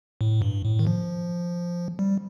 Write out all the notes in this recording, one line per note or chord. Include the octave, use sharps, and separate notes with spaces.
A2
G2
A2
D#3
F3
G3